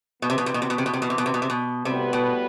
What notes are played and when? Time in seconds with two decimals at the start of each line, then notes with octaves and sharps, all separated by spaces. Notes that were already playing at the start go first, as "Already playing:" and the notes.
0.22 B2 E3 B3 F#4 B4
0.30 C3
0.38 B2
0.46 C3
0.54 B2
0.62 C3
0.70 B2
0.78 C3
0.86 B2
0.93 C3
1.02 B2
1.10 C3
1.18 B2
1.26 C3
1.34 B2
1.42 C3
1.50 B2
1.85 A2 C3 G3 B3 F#4 B4
2.13 B2